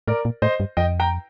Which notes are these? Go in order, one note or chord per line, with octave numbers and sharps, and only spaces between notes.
A2 A#4 D5
A#2
A2 C5 D#5
G2
F2 D#5 G5
G5 A#5